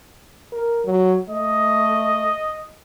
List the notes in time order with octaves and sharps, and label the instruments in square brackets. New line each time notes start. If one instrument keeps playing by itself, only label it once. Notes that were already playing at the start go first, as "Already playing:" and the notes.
[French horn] A#4
F#3
[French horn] A3 [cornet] D#5